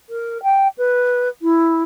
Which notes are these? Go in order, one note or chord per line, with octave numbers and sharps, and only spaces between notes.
A#4
G5
B4
E4